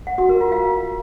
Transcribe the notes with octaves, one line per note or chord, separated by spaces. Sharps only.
F#5
F#4
A#4
F4
F5